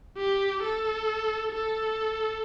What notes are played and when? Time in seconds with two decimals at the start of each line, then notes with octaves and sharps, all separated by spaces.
0.18 G4
0.63 A4
1.52 A4